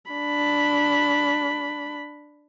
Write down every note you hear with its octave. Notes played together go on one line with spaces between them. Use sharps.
D4 B5